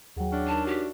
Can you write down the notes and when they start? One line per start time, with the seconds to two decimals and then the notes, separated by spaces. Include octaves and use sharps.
0.16 D#2 F#3 G#4 F#5 G5
0.32 E3 C#4 D4
0.47 D#4 A#4 A5
0.67 F#4 G4